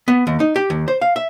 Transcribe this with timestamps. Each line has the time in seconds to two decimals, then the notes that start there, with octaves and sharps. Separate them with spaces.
0.08 B3
0.27 D#2
0.40 D#4
0.56 G4
0.70 D#2
0.88 C5
1.01 F5
1.16 E5